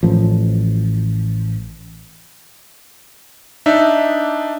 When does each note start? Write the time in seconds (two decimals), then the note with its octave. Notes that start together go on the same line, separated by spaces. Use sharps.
0.03 A1 F3
3.66 D4 D#4 E5